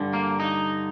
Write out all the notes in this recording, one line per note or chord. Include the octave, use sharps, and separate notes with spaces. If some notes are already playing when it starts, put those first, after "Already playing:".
Already playing: G2 D3
A#3
D#4